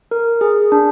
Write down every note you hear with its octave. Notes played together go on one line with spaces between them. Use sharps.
A#4
G#4
D4